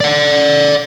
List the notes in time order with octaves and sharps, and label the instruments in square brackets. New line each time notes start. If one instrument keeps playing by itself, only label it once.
[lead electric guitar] D5 F#5